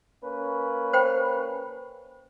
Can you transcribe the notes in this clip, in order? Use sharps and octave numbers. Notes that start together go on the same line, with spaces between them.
A#3 C#4 B4
C5 G5 B5